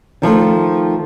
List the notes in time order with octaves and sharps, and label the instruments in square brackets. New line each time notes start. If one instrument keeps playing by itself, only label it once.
[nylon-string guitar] D#3 F3 A3